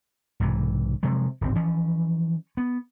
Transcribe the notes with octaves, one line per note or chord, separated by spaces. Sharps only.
B1 G#2 C3 E3
C3 F3 F#3 G#3
D1 G#1 C4
E3 F3 C#4
B3